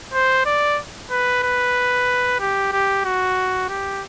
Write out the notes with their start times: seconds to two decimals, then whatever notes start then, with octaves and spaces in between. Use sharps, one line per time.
0.13 C5
0.46 D5
1.10 B4
1.43 B4
2.40 G4
2.72 G4
3.05 F#4
3.69 G4